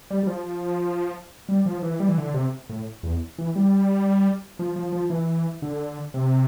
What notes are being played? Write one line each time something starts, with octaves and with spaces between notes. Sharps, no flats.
G3
G3
F3
G3
F3
E3
G3
E3
D3
C3
A2
E2
E3
G3
F3
F3
F3
E3
D3
C3